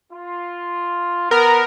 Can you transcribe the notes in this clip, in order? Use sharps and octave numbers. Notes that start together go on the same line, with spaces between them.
F4
B3 A#4